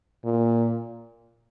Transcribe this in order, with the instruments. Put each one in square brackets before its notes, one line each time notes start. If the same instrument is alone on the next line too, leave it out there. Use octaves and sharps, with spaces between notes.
[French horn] A#2